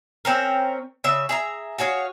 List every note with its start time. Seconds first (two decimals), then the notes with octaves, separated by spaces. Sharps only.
0.25 C4 C#4 A#4
1.04 C#3 E5
1.29 G#4 E5 A#5
1.78 F#4 G#4 C#5 F5